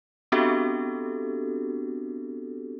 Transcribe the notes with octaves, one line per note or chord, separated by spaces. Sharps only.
B3 C4 D4 F#4 G4 A4